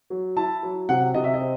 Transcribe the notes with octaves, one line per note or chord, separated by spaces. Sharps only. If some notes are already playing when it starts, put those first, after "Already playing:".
F#3
E4 A5
F#3
C3 F#5
C3 D#5
E5
D#5
C4